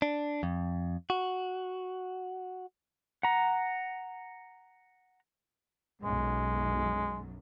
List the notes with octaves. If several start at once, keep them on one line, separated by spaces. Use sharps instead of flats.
D4
F2
F#4
F#5 A#5
B1 F#2 G#3